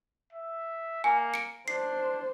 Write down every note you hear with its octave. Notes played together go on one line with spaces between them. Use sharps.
E5
A#3 G#5
C#7 D7
D4 C5 C7